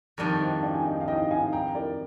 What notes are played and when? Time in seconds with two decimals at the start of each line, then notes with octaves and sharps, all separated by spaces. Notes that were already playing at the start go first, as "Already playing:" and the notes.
0.18 F2 D#3 G3 D4 A#4 D5
0.41 C5 D#5
0.63 D5 F5
0.74 G#5
0.85 D#5 G5
1.01 F5
1.08 D#5 G5
1.31 F5 G#5
1.53 G5 A#5
1.75 A#4 D5